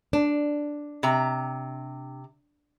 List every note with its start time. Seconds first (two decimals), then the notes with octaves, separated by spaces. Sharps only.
0.13 D4
1.03 C3 A#5